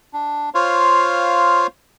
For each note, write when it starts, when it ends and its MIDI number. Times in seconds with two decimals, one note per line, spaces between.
0.13 0.50 62
0.54 1.67 65
0.54 1.67 72
0.54 1.67 73
0.54 1.67 77